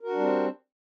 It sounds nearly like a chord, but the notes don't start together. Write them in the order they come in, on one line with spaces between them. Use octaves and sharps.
A#4 F#4 D4 G3 C4